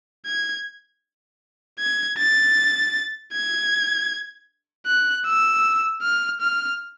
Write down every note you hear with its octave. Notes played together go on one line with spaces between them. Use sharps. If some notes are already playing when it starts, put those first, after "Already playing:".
G#6
G#6
A6
G#6
F#6
E6
F6
F6